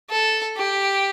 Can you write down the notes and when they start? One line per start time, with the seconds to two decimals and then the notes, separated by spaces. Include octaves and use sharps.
0.10 A4
0.57 G4